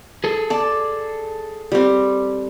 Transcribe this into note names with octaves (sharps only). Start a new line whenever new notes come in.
G#4 A4
D5 A5
G3 C4